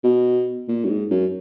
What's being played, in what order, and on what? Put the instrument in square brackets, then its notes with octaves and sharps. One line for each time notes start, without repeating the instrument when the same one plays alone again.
[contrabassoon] B2
A#2
F#2
G#2
F#2